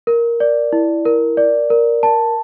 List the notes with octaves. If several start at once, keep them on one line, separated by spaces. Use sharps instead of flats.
A#4
D5
E4
A#4
D5
A#4
A5